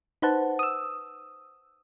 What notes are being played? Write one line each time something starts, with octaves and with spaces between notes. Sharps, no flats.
D#4 B4 C5 F#5 A5
D#6 E6